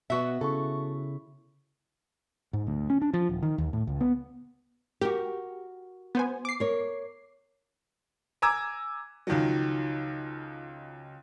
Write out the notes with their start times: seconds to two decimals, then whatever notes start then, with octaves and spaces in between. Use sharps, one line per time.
0.10 B2 B3 F#4 E5
0.41 C#3 E4 A4 C#6
2.53 G#2
2.67 D2
2.90 C#4
3.02 D4
3.14 F3
3.29 D#1
3.43 D#3
3.58 D#2
3.73 A2
3.87 C#2
4.01 B3
5.01 F#4 G4 A#4
6.15 B3 C5 G#5
6.45 D6 C7
6.60 A#4 C#5
8.42 G#5 A#5 D6 E6 G#6
9.27 C#2 D#3 F3 F#3